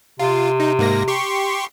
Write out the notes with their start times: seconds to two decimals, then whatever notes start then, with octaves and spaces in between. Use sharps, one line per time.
0.19 C3 F4
0.60 D#4
0.79 G#2 A#3 A#6
1.08 G4 C6 C#6